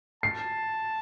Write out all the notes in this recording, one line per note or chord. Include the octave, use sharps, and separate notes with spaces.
A5 C7